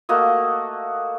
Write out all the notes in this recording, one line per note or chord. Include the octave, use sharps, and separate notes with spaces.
A3 A#3 F#4 D#5